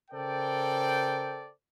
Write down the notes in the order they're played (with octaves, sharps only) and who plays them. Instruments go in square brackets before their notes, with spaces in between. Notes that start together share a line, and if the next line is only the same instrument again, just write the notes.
[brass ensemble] C#3 A4 A#4 C5 D5 G5